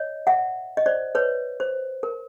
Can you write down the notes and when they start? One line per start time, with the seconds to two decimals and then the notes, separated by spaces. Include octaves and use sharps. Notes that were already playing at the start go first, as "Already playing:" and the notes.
Already playing: C#5 D#5
0.27 E5 F#5
0.77 D#5
0.86 C5 D5
1.15 B4 C#5
1.60 C5
2.03 A#4